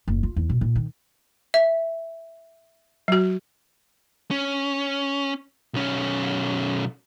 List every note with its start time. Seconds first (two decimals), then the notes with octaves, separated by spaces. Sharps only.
0.08 F#1
0.23 F4
0.36 E2
0.49 B2
0.61 A#2
0.75 D#3
1.54 E5
3.08 F#3 F#4
4.31 C#4
5.74 B1 C#4